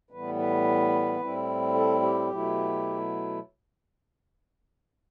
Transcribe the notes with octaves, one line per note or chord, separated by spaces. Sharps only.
A2 E3 G3 B3 B4
B4
A2 G3 C4 E4
A4
G4
B2 F#3 A3 E4